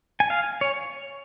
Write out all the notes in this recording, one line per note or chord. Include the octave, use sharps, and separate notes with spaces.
G#5
F5
C#5